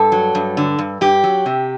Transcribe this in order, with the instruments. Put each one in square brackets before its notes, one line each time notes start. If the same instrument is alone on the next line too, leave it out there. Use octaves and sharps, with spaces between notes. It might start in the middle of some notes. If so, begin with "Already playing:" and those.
Already playing: [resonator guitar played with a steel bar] G2 A4
F#3
G2
D3
G2
G2 G4
F#3
C3